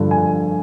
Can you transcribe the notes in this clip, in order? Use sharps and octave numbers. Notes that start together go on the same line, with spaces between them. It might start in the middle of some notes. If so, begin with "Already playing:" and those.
Already playing: G2 D3 F3
G#5